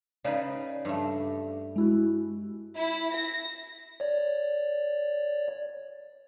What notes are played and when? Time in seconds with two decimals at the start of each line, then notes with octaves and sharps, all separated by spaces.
0.24 C#3 D#4 B4 D5
0.85 G2 A3
1.76 G#3 E4 F#4
2.74 E4
3.14 A#6
4.00 C#5 D5